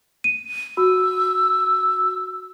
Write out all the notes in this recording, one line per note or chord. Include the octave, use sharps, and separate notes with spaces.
D#7
F#4 E6